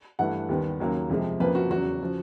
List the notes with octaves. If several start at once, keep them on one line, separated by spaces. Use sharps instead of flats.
G2 E3 A3 F#5
D#2 D#3 G3 B3
D#2 C#3 F#3 A#3
F2 C3 F3 G#3
F2 C#3 F3 A#3 B4
F#4
E2 C#3 F#3 F#4
C#3 F3